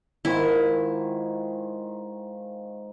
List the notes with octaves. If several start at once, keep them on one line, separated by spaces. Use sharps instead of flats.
G#2 D#3 E4 F4